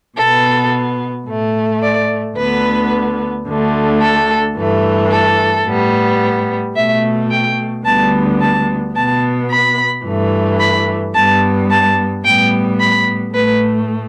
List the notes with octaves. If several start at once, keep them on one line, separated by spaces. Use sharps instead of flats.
B2 B3 A4
A2 A3
D5
D2 D3 B3 B4
D2 D3 A3
A4
G2 E3 A3
A4
A2 G3 B3
B2 A3 E5
G5
D2 D3 G3 B3 A5
A5
B2 B3 A5
B5
G2 E3 A3
B5
G2 G3 B3 A5
A5
A2 G3 B3 G5
B5
A2 A3 B4